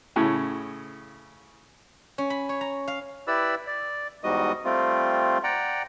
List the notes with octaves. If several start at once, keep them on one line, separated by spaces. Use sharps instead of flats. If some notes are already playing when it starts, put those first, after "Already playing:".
A2 C#3
C#4
B5
C#5
A#5
F5
E4 G4 B4 D5 B5 E6
D5
E2 G#2 G3 F#4 D#5 D#6
G3 A3 C4 F4
D5 F#5 G5 A#5